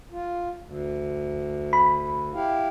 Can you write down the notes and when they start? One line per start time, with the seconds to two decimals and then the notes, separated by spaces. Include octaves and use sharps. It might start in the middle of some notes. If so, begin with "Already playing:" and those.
0.12 F4
0.62 D2
1.73 B5
2.34 E4 G4 F5